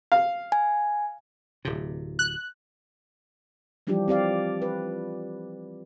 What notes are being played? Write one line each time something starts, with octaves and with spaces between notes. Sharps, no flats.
F5
G#5
D1 C3
F#6
E3 F3 G3 D4 F4 G4
C4 G4 D5 F5
B4